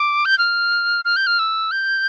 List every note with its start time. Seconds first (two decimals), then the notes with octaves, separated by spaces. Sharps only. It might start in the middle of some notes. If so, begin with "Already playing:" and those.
Already playing: D6
0.25 G6
0.38 F6
1.05 F6
1.16 G6
1.27 F6
1.39 E6
1.71 G6